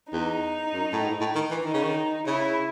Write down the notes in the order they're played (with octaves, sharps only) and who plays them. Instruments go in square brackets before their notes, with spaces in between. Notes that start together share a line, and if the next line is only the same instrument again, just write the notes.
[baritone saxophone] E2 [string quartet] D#4
[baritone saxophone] F#2
A2
G#2
A2
D#3
E3
[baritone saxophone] D#3 [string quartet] D#4
[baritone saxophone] C#3
D#3
[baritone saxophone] C#3 [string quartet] E4